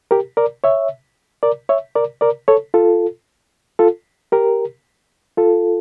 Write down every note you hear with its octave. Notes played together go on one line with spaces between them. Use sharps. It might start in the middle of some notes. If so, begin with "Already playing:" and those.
G4 A#4
A#4 D5
C#5 E5
A#4 D5
C#5 E5
A#4 D5
A#4 D5
A4 C#5
F4 A4
F4 A4
G4 A#4
F4 A4